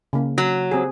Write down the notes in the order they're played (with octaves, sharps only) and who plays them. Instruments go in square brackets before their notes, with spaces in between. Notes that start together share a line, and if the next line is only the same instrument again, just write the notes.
[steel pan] C#3 A#3
[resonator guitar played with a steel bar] F#3
[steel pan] C4 G4 G#4